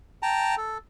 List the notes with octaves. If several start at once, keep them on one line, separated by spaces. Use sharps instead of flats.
G5 A5 A#5
A4